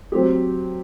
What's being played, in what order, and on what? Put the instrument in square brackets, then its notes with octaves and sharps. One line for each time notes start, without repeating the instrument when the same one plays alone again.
[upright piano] F#3 C4 G4